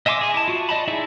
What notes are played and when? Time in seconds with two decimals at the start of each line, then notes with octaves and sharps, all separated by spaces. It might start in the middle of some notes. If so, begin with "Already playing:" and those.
0.06 D#5 E5 G#5 C6 D6
0.21 G#4 G#5
0.34 E4 A5
0.48 F4 F#4
0.69 D5 D#5 A5 B5
0.88 D#4 E4 G#4 D5 E5